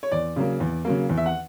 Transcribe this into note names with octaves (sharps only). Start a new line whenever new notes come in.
C#5
E2 D5
C#3 F#3 A#3
E2
C#3 F#3 A#3
E2
E5
F#5